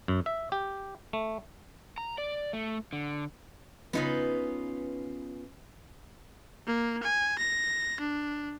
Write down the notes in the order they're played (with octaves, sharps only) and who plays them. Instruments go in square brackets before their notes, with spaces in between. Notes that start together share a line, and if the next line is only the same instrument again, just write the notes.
[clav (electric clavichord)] F#2
E5
G4
A3
[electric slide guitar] A#5
D5
A3
D3
[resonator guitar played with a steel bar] C#3 D#4 B4 [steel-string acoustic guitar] B3 C#4 F4
[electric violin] A#3
G#5
A#6
D4